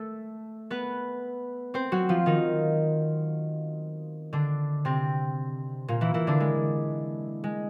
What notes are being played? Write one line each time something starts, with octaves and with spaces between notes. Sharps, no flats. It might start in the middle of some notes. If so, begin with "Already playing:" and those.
Already playing: A3 A4
B3 B4
C4 C5
F#3 F#4
F3 F4
D#3 D#4
D3 D4
C3 C4
A#2 A#3
E3 E4
E3 E4
D3 D4
G#3
G#3